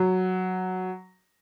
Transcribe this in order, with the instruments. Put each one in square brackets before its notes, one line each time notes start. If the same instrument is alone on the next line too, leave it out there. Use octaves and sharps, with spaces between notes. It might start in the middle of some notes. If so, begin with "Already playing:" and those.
Already playing: [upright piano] F#3